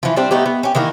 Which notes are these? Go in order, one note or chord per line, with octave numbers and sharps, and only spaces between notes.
E3 F3
G3 C4 D4
A3 B3 D#4 G4
B3
C#4 G4
D#3 E3 A#3 A#4